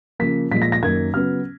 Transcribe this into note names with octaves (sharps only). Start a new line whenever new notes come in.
C#3 F3 A#3 B6
A#2 F3 G#3 B6
A#6
A#6
F#2 D#3 A#3 G#6
C#3 F#3 B3 F6